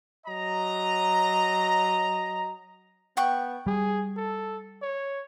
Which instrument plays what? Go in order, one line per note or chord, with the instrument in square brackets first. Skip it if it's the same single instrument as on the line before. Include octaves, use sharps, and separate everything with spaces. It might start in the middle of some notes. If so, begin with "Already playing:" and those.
[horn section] F#3 D#5 A#5
[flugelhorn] B3 [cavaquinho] F#5 G5 C#6
[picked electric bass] G3 [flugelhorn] G#4
[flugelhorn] A4
C#5